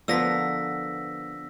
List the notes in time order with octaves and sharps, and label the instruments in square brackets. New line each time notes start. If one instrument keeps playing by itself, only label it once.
[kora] D3 F3 A#4 [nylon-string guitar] B3 [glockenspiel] E6 A#6 B6